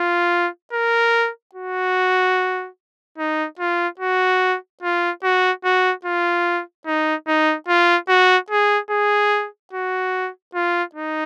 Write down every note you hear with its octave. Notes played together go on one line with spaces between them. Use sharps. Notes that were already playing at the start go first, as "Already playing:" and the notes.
Already playing: F4
A#4
F#4
D#4
F4
F#4
F4
F#4
F#4
F4
D#4
D#4
F4
F#4
G#4
G#4
F#4
F4
D#4